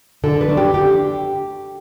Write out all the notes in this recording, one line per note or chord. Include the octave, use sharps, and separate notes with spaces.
D3 A4
B4
A3 D4
G4
D3 G4